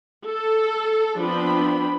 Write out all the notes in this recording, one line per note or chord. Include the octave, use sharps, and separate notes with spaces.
A4
F3 B3 C4 D4 B5